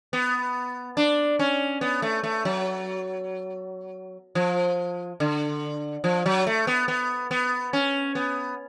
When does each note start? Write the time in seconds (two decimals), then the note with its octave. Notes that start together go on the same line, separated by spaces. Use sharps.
0.13 B3
0.97 D4
1.39 C#4
1.81 B3
2.02 A3
2.23 A3
2.45 F#3
4.35 F3
5.20 D3
6.04 F3
6.26 F#3
6.47 A3
6.67 B3
6.88 B3
7.31 B3
7.73 C#4
8.15 B3